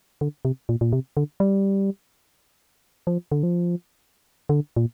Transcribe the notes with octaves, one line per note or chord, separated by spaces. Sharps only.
D3
C3
A#2
A#2
C3
D3
G3
F3
D3
F3
D3
A#2